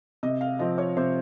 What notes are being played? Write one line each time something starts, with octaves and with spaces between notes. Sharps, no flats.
C3 D#5
F5
F3 C4 D#5
C#5
C3 C5